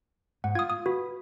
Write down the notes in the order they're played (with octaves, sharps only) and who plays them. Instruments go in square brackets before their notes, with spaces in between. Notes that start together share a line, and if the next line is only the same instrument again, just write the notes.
[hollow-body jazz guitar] G#2 [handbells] F#5
[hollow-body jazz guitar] F4 [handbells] D#6 G#6
[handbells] D#6
[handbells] F#4 [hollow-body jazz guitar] B4